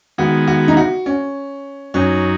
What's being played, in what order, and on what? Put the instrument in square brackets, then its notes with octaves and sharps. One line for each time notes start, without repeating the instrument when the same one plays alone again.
[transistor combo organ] D#3 G#3 B3 [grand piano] F#4
[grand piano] F#4
D#4
F#4
C#4
[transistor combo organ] F#2 F#3 D#4 [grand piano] C#4